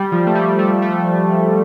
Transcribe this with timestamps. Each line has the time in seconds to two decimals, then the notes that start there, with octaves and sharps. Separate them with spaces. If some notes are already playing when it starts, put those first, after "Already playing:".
Already playing: G3
0.12 F3
0.26 A3
0.35 G3
0.59 A3
0.82 A3